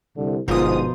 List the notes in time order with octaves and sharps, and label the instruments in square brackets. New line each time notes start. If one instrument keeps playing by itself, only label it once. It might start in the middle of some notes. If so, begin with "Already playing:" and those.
[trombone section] C2 [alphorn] D3
[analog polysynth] G1 D#6 [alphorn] G#2 [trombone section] B2 F3 [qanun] F4 A#4 C5